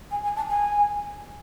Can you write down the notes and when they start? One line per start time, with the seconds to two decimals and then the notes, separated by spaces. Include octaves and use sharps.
0.11 G#5
0.24 G#5
0.36 A5
0.49 G#5